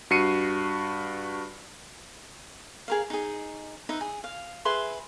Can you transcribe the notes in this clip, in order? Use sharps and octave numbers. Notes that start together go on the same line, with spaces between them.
G2 F#4 C7 C#7 D#7
G#4 A#4 F5
D#4 G#4
D#4 B4 E5
G#4
F5
G#4 B4 E5 C6